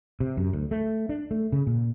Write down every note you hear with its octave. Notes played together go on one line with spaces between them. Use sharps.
C3
F#2
D2
A3
D4
A3
C#3
A#2